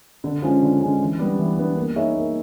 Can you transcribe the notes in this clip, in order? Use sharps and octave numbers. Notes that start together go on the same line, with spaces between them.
D3
F3 G#3 C#4
D3
F3 G#3 C#4
E3
G3 B3 D4
E3
G3 B3 D4
A#3
D#4 G#4 C#5 E5
A#3